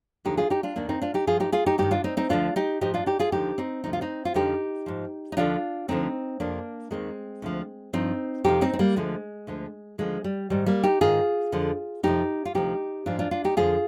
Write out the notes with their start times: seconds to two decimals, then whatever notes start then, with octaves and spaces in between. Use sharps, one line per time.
0.25 D#2 D3 F3 D#4 G4
0.37 F4 G#4
0.50 D#4 G4
0.63 D4 F4
0.76 D#2 D#3 A#3 D4
0.89 C4 D#4
1.02 D4 F4
1.14 D#4 G4
1.27 G2 F3 F4 G#4
1.40 D#4 G4
1.52 F4 G#4
1.66 D#4 G4
1.78 G2 D#3 D#4 G4
1.91 D4 F4
2.04 C4 D#4
2.17 C4 D#4
2.29 D2 D3 F3 D4 F4
2.56 D#4 G4
2.81 G#2 F3 D#4 G4
2.94 D4 F4
3.06 D#4 G4
3.19 F4 G#4
3.32 D#2 D3 F3 D#4 G4
3.58 C4 D#4
3.84 D2 C3 F3 D#4
3.93 F4
4.01 C4 D#4
4.25 F4
4.34 F2 D3 F3 D#4 G4
4.86 G#2 F3
5.32 D#4
5.37 D#2 D3 F3 D4 F4
5.88 D2 D3 F3 C4 D#4
6.40 F2 C3 F3 A#3 D4
6.91 D#2 D#3 G#3 C4
7.42 D2 D3 F3
7.93 G2 F3 C4 D#4
8.44 F2 C3 F3 D#4 G4
8.61 C4 D#4
8.73 C4
8.79 G3 A#3
8.96 D2 D3 F3 G#3
9.47 D2 D3 F3
9.98 D#2 D3 F3 G#3
10.24 G3
10.50 G#2 D#3 G3
10.66 G3 A#3
10.83 D#4 G4
11.01 G#2 D#3 F4 G#4
11.52 F2 D3 F3
12.03 F2 C3 F3 D#4 G4
12.45 F4
12.55 D2 C3 F3 D#4 G4
13.06 G#2 F3 D4 F4
13.19 D4 F4
13.31 D4 F4
13.44 D#4 G4
13.57 F2 D3 F3 F4 G#4